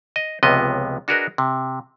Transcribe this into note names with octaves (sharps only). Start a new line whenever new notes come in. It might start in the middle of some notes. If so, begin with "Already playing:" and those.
D#5
C#2 C3 F3 B3 D#5
D4 F#4 G#4 A#4 B4 D#5
C3